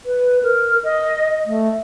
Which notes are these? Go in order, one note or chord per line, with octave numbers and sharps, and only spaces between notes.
B4
A#4
D#5
A3